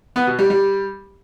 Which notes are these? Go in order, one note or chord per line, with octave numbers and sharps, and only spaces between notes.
B3
B2
G3
G3